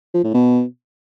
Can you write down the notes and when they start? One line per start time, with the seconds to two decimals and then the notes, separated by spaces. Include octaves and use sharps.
0.14 F3
0.24 A2
0.34 B2